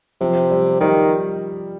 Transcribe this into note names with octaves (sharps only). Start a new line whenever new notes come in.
C3 F3
G3
D#3 G3